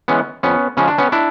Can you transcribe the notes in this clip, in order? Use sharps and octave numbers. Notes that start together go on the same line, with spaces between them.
E3 G#3 B3 C#4
F2 B3 C#4
C#3 F3 G#3 C#4
D4
B3 C#4
D4 E4